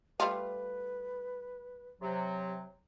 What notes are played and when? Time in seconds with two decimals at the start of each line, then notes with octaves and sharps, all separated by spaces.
0.20 G3 A3 F4 B4
2.01 C3 F#3